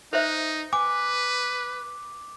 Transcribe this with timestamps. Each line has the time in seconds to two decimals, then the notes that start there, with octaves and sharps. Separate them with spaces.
0.13 D#4 B4 C5 E5
0.73 B4 G#5 D6